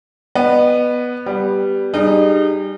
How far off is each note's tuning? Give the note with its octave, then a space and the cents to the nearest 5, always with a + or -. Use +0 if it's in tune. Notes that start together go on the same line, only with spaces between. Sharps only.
B3 +0 D#5 -35
G3 +0 B3 +0
G3 +0 D#4 -35 G#4 +0